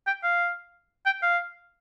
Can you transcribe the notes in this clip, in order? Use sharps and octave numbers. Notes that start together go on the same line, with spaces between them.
G5
F5
G5
F5